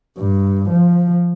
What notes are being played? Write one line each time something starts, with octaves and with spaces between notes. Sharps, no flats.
G2
F3